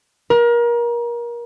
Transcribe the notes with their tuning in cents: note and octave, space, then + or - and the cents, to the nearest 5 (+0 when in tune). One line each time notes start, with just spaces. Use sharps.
A#4 +30